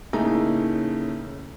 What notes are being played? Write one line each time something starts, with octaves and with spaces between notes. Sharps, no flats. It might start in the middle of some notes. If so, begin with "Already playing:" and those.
A2 C#3 A3 A#3 C#4 D#4